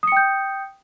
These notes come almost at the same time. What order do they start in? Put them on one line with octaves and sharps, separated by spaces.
D#6 C#7 G5 G6